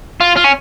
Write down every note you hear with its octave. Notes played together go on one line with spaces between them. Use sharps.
F4
F4
C#4